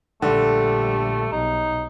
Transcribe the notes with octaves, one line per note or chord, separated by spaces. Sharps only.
A#1 D3 G3 A3
B1 D#4